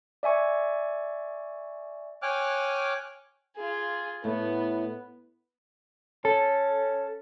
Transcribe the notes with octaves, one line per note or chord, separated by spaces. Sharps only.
D5 E5 G#5 C#6
C#5 G5 G#5 D6 F6 F#6
F4 G#4
A2 A3 B3
C#4 A4